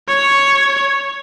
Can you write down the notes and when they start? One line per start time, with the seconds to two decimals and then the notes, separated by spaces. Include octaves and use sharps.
0.09 C#5